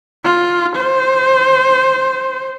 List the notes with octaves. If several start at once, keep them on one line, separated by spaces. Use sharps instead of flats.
F4
C5